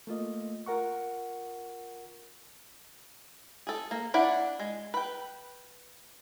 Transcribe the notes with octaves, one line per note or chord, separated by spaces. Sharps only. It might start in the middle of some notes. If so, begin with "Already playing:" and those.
A3 A#3 F4 D#5
F4 A#4 F#5 C#6
G#4 A4
A#3
D4 E4 D5 F#5
G#3
B4 G5